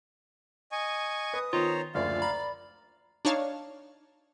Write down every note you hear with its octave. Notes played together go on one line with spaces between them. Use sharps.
D#5 G#5 C#6
B4 D#6
D#3 B3 F4 C5 C#5 A#5
F#1 D2 F3 D5 F5
A#5 B5
D4 D#4 C#5 F5 A5